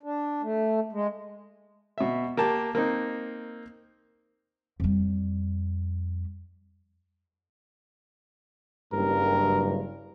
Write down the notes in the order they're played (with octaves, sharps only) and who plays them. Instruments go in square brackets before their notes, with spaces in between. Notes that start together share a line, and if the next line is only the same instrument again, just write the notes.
[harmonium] D4
A3
G#3
[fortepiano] B2 E5
A#3 G4 A5
A#3 C4 D#4
[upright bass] F2 G3
[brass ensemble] F#1 G2 [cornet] A#4